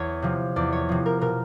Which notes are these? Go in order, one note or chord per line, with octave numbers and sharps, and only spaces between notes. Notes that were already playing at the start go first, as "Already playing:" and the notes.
Already playing: E2 C#5
C3 F3
E2 D5
C#5
C3 F3
A#4
B2 A#4